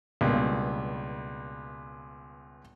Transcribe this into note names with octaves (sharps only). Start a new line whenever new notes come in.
C#2 G2 B2 A#3